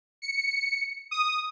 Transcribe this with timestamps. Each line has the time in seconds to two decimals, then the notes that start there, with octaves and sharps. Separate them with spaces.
0.22 C#7
1.11 D#6